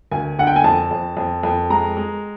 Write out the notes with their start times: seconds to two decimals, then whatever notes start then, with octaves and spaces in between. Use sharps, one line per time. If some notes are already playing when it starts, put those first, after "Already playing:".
0.12 D2 G#5
0.39 D3 F#5
0.47 G5
0.56 G#5
0.64 F2 A5
0.91 F2
1.17 F2
1.43 F2
1.70 G#3 A#5
1.97 G#3